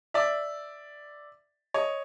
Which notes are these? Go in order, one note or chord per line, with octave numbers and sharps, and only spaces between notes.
D5 E5
C#5 D#5